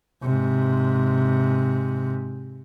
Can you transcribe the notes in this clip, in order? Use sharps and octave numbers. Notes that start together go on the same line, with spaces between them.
G#2 C3